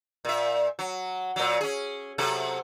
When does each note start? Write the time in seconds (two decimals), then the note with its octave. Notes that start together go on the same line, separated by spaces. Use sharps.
0.25 A#2 E5
0.79 F#3
1.36 A#2 F#3
1.61 C#4 G#4
2.18 C3 F#3 A4